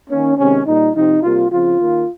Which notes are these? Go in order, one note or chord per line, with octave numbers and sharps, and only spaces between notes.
D#3 A#3 C#4
C3 D#3 G#3 C4 C#4
A#2 G3 A#3 D#4
C3 F3 C4 D#4
C3 G3 A#3 F4
C#3 F3 C4 F4
D#3 A#3